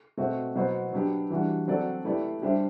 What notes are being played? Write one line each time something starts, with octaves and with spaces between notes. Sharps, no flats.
B2 A3 C4 F#4
B2 F#3 B3 F#4 C5
F#3 B3 D4 G4
E3 G3 D4 F#4
F#3 C4 F#4 A4 D5
A3 E4 G4 B4 D5
G3 D4 G4 C5 E5